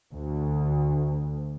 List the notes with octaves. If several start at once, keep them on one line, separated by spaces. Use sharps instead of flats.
D2